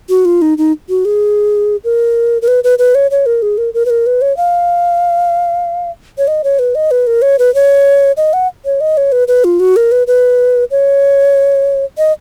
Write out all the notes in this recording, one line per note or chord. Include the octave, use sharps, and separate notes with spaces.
F#4
F4
D#4
D#4
F#4
G#4
A#4
A#4
B4
B4
B4
C#5
C#5
A#4
G#4
A#4
A#4
B4
A#4
B4
C#5
F5
C#5
D#5
C#5
B4
D#5
B4
A#4
C#5
B4
C#5
D#5
F#5
C#5
D#5
C#5
B4
B4
F4
F#4
A#4
B4
B4
C#5
D#5